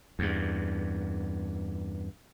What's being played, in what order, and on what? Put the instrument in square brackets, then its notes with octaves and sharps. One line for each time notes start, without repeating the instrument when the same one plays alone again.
[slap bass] E2 G2